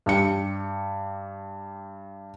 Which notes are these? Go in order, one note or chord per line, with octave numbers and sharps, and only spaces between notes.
G2 G4 C#7